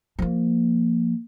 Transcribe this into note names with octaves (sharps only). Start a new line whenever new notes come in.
F3 A#3